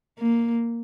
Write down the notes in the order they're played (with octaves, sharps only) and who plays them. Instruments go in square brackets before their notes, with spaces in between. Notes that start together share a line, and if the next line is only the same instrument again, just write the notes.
[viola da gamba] A#3